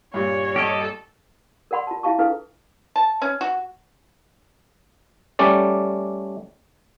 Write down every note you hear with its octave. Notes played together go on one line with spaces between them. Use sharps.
G2 A#2 G3 C#5
G4 A4 D#5
A#4 D5 F#5 B5 C6
F4 A5
E4 F4 E5 F5 A5 C#6
D4 E4 G#4 A4 B4 F5
A5
C#4
F#4
G3 A3 C#4 D5